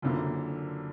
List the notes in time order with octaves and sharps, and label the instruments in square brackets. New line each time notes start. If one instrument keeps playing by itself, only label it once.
[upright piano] F#1 F#2 D3 F3 A#3